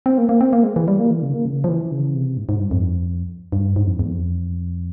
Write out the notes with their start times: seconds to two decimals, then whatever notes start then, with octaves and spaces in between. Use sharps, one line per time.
0.06 C4
0.18 A#3
0.29 A#3
0.41 C4
0.53 A#3
0.63 G#3
0.76 E3
0.88 G3
0.99 A#3
1.11 E3
1.22 C#3
1.34 A#3
1.45 C#3
1.64 F3
1.69 E3
1.92 C#3
2.14 C3
2.37 G#2
2.49 G#2
2.60 G2
2.71 F2
3.52 G2
3.76 G#2
3.87 F2
3.99 E2
4.10 F2